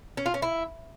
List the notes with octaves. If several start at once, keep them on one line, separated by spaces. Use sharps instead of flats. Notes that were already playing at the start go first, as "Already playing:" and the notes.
C#4
F4
C#4
E4